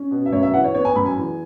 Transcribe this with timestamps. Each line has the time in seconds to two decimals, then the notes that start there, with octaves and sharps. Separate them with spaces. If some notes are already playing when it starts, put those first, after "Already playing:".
Already playing: C#4
0.11 B2
0.26 E5
0.32 F#2 C#5
0.43 E5
0.54 E3 F#5
0.64 C#5
0.75 B3 C#5
0.85 G#5
0.95 F#2 B5
1.06 G#5
1.17 E2